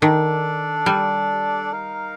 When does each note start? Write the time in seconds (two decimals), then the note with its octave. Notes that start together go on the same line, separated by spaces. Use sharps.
0.02 D#3 D4 A4 D5
0.86 G3
1.72 D#4 A#4 F5